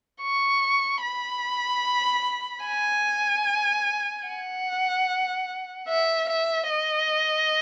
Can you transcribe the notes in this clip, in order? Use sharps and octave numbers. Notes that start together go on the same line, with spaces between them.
C#6
B5
G#5
F#5
E5
E5
D#5